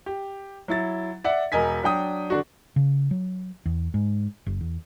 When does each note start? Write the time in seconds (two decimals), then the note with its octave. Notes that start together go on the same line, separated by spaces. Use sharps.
0.06 G4
0.68 F#3 E4 A6
1.24 D5 E5 F#5
1.52 E1 A#4 D#5 G#5 B6
1.83 F#3 D4 G5 D#6
2.30 D3 D4 F#4
2.76 C#3
3.11 F#3
3.66 E2
3.94 G#2
4.46 F#1
4.61 E2